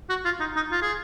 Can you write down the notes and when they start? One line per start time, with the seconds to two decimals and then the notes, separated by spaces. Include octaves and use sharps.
0.09 F#4
0.25 F4
0.40 D#4
0.56 D#4
0.72 F4
0.82 G#4